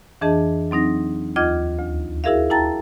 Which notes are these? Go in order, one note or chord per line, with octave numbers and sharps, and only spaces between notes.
F2 E3 D4 G#4 D#5 A5
F#3 C4 D#4 A#6
D#2 F4 D#5 D6 F6 G#6
D2
E4 F#4 G#4 A#4 E5 F5
E4 G5 A5 A#5 A6